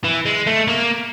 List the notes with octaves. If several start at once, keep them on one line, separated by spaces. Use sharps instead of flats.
E3
G#3
A3
A#3